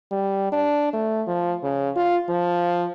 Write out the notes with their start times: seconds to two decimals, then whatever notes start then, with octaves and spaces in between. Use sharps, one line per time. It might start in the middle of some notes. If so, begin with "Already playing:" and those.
0.11 G3
0.52 D4
0.93 A3
1.27 F3
1.63 C#3
1.96 F4
2.29 F3